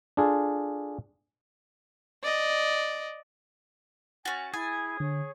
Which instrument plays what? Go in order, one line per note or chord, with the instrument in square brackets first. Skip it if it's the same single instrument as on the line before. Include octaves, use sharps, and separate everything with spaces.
[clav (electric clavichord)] D4 F4 G#4 A4
[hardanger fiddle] D5 D#5
[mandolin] C#4 F#4 [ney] G#5 [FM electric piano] A6
[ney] E4 [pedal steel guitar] G#4 [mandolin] G#5
[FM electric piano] D3 [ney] C#5